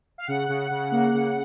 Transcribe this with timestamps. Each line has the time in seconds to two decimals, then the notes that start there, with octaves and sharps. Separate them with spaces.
0.18 F5
0.27 C#3 F#5
0.49 C#3
0.71 C#3
0.92 A#3
1.13 C#3